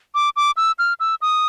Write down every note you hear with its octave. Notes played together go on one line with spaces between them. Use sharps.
D6
D6
E6
F6
E6
D#6